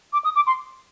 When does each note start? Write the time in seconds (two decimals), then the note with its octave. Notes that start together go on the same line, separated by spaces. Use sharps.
0.13 D6
0.25 D#6
0.36 D6
0.47 C6